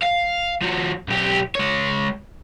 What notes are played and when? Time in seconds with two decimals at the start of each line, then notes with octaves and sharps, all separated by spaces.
0.03 F5
0.62 F3 F#4
1.08 B1 G4
1.55 G#3 C#5